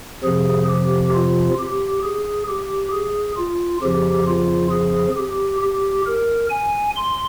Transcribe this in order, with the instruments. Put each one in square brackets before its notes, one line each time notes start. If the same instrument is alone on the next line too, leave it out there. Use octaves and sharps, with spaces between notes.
[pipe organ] F2 C3 F3 G#4
G4
F4
G4
G#4
G4
G#4
F4
F2 C#3 F3 G4
F4
G#4
G4
G4
A#4
G#5
C6